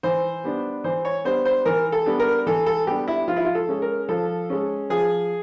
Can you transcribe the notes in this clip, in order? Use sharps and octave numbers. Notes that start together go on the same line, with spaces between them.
E3 C5
G3 B3 D4
E3 C5
C#5
G3 B3 D4 C5
C5
E3 A#4
A4
G3 B3 D4
A#4
E3 A4
A4
G3 B3 D4 G4
E4
F3 F4
E4
F4
A4
G#3 C#4
A#4
F3 A4
G#3 C#4
F3 G#4